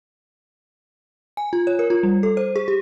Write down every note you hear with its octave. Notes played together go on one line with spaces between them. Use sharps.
G#5
F4
C#5
A#4
F4
G3
A4
C5
G#4
G4